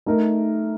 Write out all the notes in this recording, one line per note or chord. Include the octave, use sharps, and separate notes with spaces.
A3 D#4 A#4